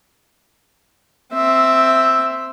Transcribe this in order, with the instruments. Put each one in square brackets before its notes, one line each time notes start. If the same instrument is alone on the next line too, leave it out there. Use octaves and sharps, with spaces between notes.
[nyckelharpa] C4 E5